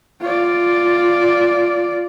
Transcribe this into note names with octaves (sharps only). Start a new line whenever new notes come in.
F4 D5